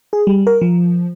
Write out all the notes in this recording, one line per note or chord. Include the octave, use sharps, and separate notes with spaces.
G#4
G3
A#4
F3